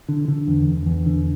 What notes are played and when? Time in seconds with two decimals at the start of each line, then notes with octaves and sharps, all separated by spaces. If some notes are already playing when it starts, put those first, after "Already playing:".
0.09 D3
0.28 D3
0.48 E2
0.67 E2
0.86 E2
1.06 D3